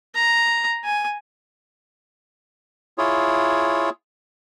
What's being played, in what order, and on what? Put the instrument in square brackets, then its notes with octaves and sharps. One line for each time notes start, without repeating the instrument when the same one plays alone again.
[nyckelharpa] A#5
G#5
[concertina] E4 F4 G#4 C#5